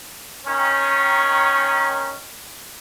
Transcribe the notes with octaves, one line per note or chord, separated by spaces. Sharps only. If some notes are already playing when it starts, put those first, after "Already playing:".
D#3 C#4